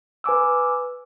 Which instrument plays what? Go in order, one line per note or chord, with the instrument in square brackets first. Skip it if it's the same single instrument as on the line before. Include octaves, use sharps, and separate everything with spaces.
[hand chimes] B4 G#5 D6 E6